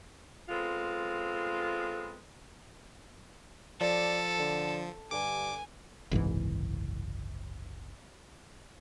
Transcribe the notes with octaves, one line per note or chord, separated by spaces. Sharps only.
G#3 B3 C4 F4 A4
F3 A4 D5
D3
G2 D3 G#5 D6
F#1 C2 G#2 E3